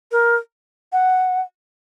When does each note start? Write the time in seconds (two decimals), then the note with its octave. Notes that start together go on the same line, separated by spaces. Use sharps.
0.12 A#4
0.92 F#5